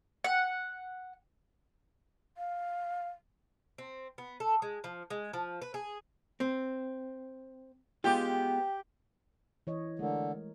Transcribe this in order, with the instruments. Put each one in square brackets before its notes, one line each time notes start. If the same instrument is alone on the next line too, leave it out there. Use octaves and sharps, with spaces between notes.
[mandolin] F#5
[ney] F5
[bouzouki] C4
B3
A4
G#3
F3
G#3
F3
B4
G#4
[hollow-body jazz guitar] C4
[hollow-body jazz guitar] G#3 B3 F4 [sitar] G4
[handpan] E3 C#5 D#5
[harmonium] D3 [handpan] G#3 A3 A#4